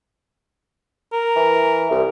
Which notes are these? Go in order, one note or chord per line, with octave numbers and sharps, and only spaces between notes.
A#4
E3
C2